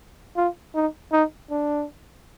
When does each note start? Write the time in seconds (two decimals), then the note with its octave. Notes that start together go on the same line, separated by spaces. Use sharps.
0.37 F4
0.75 D#4
1.12 D#4
1.51 D4